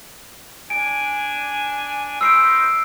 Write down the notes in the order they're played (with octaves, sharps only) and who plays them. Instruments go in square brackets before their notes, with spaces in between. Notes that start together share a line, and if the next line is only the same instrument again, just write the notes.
[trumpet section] D4 G#5 [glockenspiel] D7
[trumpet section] D#4 B4 C5 [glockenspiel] E6 C7 D7